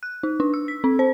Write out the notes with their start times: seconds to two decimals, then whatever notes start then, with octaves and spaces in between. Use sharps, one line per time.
0.03 F#6
0.23 D#4
0.40 D4
0.54 E6
0.68 B6
0.84 C4
0.99 C5